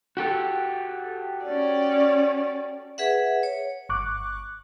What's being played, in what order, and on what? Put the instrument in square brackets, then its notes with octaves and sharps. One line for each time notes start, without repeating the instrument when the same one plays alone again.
[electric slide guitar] F#4 G4 A4
[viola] C#4 D5
[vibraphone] G#4 B4 E5 F#5
C#5
[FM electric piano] G1 C#6 D6 F#6